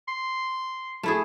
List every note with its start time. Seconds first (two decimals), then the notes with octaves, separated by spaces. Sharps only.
0.08 C6
1.03 A3 E4 G#4